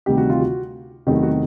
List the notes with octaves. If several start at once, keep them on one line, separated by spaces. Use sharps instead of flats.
D2 C3 D#3 G3 G4
F#4
F4
F#4
E2 C3 D#3 F#3 A3 G4
F#4